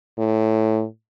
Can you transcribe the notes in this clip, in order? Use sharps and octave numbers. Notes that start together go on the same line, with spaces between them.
A2